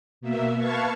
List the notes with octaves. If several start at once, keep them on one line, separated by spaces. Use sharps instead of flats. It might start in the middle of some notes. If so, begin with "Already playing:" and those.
B2 A#3 E5
B4 F5 A5 C#6 G#6